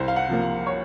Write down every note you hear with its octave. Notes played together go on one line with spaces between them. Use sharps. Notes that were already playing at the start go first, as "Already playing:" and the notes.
Already playing: C2 C5
F5
F#5
C3 F3 A#3
F5
C#5